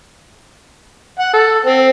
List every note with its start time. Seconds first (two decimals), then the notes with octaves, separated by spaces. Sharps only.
1.19 F#5
1.33 A4
1.66 C4